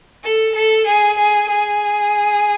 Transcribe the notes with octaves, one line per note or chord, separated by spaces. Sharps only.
A4
A4
G#4
G#4
G#4